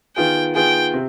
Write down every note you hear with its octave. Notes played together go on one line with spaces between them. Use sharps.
D#3 B3 F4 G#4 G5
D#3 B3 F4 G#4 G5
C3 C4